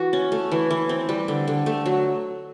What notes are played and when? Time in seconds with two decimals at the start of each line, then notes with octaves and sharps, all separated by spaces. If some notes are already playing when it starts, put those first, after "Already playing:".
Already playing: E3 F#4
0.13 C#4
0.32 A3
0.51 E3
0.71 E3
0.89 C4
1.09 G3
1.28 D3
1.48 D3
1.66 A3
1.86 F#3